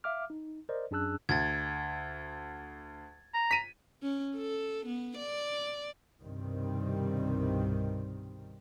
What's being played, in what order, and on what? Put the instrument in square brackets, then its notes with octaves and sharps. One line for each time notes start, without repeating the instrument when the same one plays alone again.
[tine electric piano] E5 F5 D6 F6
D#4
A#4 C5 D5 D#5
F#2 D4 G#4 A5 E6 F#6
[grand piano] D2 [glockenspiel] G#6 A6
[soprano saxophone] A#5
[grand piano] B6 D#7
[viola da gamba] C#4
A4
B3
D5
[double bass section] C2 G2 B2 D#3 G3 C4